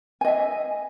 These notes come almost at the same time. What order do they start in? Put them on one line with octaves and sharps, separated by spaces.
G#5 D#5 E5